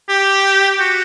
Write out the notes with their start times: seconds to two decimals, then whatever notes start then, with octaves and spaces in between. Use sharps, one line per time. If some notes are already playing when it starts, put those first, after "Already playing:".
0.09 G4
0.80 F#4